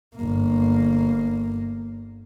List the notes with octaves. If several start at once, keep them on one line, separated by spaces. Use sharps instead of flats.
G1 A#3